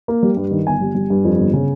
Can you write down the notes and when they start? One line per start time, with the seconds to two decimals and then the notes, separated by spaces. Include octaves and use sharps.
0.08 A#3
0.23 G3
0.37 G2
0.51 D#3
0.67 G1 G#5
0.81 G3
0.95 G3
1.10 G2
1.25 F2
1.38 G1
1.53 C#3